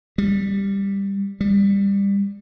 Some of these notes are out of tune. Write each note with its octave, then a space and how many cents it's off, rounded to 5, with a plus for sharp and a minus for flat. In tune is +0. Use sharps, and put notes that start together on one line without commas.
G3 +10
G3 +20